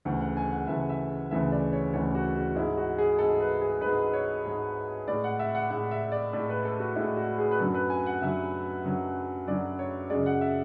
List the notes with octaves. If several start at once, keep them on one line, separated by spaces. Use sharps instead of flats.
D2 C#3 E3 A3
F#5
G#5
F#5
D2 C#3 E3 A3 E5
E5
D2 C#3 E3 A3 E5
D5
C#5
D2 C#3 E3 A3 C#5
F#4
F#4
G#2 G#3 E4
F#4
G#4
G#2 G#3 A4
B4
G#4
G#2 G#3 B4
C#5
G#2 G#3
A2 G#3 D5
F#5
E5
F#5
A2 G#3 F#5
E5
D5
A2 G#3 D5
B4
A4
F#4
A2 G#3 E4
F#4
G#4
B4
F#2 D3 F#3 A4
B4
G#5
F#5
F#2 D3 F#3 E5
F#2 D3 F#3
F#2 D3 F#3 D5
C#5
F#2 C#3 G#3 D5
F#5
E5